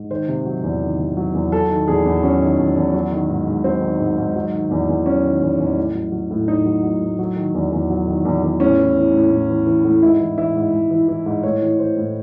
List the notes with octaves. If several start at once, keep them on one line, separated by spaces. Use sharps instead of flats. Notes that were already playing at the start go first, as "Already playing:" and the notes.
Already playing: G#2
D#3 C5
C3
F#3
E2
D#3
C3
F#3
E2
F#3 A4
D#3
E2 G#4
E2
F#3 C#4
D#3
E2
E2
F#3
D#3
G#2
G#2
F#3 C4
D#3
G#2
G#2
F#3
D#3
E2
E2
F#3 C#4
D#3
E2
E2
A2
F#3
F#3
A2
A2 D#4
F#3
F#3
A2
F#3
D#3
E2
E2
F#3
D#3
E2
E2
A2 C#4
E3
E3
A2
A2
E3
E3
A2
G#2 E4
E3
E3 E4
G#2
G#2
E3
E3
G#2
A2 C#5
E3
E3 C5
A2